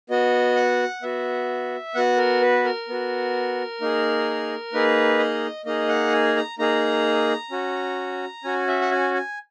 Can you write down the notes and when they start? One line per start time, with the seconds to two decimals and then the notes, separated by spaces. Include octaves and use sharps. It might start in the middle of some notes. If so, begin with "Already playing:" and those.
0.10 B3 F#4 D#5
0.56 F#5
1.02 B3 F#4 E5
1.95 B3 F#4 F#5
2.18 A#4
2.42 B4
2.65 A#4
2.88 B3 F#4
3.81 A#3 D#4 G#4
4.73 A#3 D#4 G#4 B4
5.19 D#5
5.66 A#3 D#4 G#4 D#5
5.89 F#5
6.13 G#5
6.36 A#5
6.59 A#3 D#4 G#4 A#5
7.51 C#4 F#4
8.44 C#4 F#4 G#5
8.67 E5
8.81 F#5
8.91 G#5
9.14 G#5